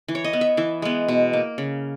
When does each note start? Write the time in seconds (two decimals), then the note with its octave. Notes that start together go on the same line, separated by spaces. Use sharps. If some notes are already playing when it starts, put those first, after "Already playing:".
0.08 E3
0.15 C#5
0.24 D#5
0.33 B3
0.41 E5
0.57 E3 E5
0.82 G#3 B3
1.08 B2
1.33 A#3
1.58 C#3